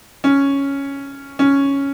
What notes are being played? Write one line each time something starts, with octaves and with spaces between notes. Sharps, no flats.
C#4
C#4